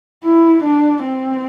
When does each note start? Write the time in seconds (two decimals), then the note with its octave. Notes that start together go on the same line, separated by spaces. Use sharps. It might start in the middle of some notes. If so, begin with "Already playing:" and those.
0.24 E4
0.64 D4
1.03 C4